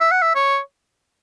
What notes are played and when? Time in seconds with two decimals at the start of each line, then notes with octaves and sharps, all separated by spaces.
0.01 E5
0.11 F#5
0.22 E5
0.35 C#5